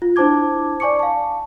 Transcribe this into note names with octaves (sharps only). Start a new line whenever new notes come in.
F4
D4 E4 C5 A5 D6 G#6
D5 G#5 C#6 D6 C#7
F5 A5